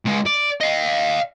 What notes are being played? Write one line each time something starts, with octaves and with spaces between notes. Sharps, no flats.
C#2 G#3
D5
D#5 F5